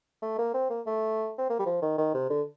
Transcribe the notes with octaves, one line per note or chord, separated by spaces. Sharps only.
A3
A#3
C4
A#3
A3
C4
A#3
G3
F3
D#3
D#3
C3
D3